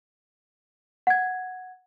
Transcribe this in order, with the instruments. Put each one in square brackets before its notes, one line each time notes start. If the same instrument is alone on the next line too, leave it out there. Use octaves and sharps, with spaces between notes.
[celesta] F#5 G#6